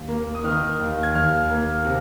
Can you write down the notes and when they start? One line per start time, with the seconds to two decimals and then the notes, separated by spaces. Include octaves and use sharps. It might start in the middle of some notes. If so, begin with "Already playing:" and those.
Already playing: D#2
0.08 A#3
0.35 D#6
0.44 D#3 F6
0.80 D#2
1.03 G#6
1.15 D#2 F6
1.50 A#3
1.85 C3